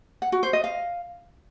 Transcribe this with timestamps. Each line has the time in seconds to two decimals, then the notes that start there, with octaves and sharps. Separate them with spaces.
0.22 F#5
0.32 F#4
0.43 C5
0.53 D#5
0.64 F5